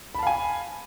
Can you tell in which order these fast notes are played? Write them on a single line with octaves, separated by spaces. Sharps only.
B5 A5 F5 G#5